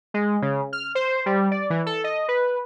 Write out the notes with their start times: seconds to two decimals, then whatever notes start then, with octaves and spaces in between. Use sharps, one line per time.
0.14 G#3
0.42 C#3
0.73 F6
0.95 C5
1.26 G3
1.51 D5
1.70 E3
1.86 A4
2.04 D#5
2.28 B4